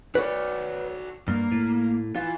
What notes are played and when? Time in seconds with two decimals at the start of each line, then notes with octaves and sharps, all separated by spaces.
0.15 F#4 B4 C#5 D5
1.28 G2 A#3
1.52 A2
2.16 E3 F4